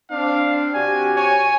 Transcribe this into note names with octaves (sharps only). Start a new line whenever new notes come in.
C4 D4 F5
C3 F#4 G4 G#5
C#5 G#5